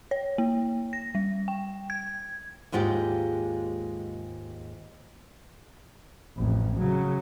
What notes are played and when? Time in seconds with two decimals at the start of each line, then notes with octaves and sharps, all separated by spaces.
0.11 C#5
0.38 A#3
0.93 A#6
1.15 G3
1.48 G5
1.90 G#6
2.72 D#2 G#2 G#3 F4 G4
6.37 A1 F2
6.77 C#3 F#3